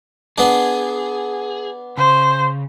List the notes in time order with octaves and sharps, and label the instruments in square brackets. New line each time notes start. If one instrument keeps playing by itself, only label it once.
[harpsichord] B3 D4 [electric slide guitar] G#4
[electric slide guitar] C#3 [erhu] C5